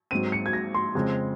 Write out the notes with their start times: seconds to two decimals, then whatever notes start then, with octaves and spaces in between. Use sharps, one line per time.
0.11 G#2 F#3 C4 D#7
0.32 C#7
0.46 G#6
0.53 A#6
0.74 C6
0.95 F2 C#3 G#3 C4